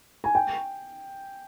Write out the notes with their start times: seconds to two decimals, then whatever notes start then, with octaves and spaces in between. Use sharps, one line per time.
0.24 G#5
0.35 G5